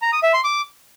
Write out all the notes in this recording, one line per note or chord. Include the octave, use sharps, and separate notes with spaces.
A#5
D#6
E5
C6
D6